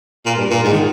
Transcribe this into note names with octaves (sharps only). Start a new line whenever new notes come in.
A#2
G2
A#2
G#2
D#3